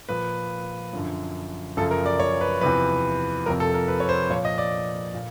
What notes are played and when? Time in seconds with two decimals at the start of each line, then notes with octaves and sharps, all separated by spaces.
0.09 A#2 F3 B4
0.93 F#2 D3 F3
1.77 F#2 C#3 F3 A4
1.91 A#4
2.06 D5
2.20 C#5
2.41 B4
2.61 E2 C3 F3 B4
3.46 F2 C3 F3 A#4
3.60 A4
3.74 A#4
3.88 B4
4.00 C#5
4.09 C5
4.30 A#2 F3 C#5
4.45 D#5
4.58 D5
5.14 A#2